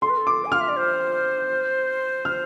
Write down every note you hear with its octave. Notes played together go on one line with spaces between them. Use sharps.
A4 C6
B4
A4
D6
G#5
F5 F6
E5
D5
C5
F6